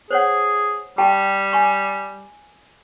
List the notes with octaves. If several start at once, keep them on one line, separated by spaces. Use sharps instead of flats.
G#4 C5 C#5 F#5
G3 G4 G5 A5
G#5 C#6